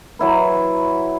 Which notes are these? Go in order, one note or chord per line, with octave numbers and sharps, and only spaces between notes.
F#3 E4 B4